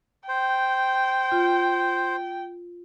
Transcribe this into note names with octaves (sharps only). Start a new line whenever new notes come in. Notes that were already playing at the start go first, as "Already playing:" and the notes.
C5 G5
F4